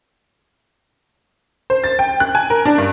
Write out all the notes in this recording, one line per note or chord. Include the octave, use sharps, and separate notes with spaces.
C5
A6
G5
F#6
G#5
A#4
D4
G2